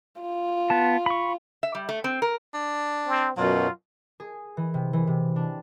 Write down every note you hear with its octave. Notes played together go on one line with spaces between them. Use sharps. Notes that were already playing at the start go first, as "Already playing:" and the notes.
F4
B3 A5
B5 C#6
E5
G3
A3
C4
A#4
D4
C4
F#2 B2 F#3 F4
G#4
E3
C3
E3
C3
D4